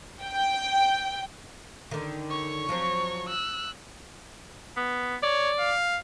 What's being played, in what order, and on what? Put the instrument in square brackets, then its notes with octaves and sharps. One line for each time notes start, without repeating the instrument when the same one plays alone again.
[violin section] G5
[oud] D3 D#3
[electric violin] C#5 C#6
[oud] F3 F#3 C4
[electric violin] E6 F#6
[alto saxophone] B3
[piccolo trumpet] C#5 [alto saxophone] D5
[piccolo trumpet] F5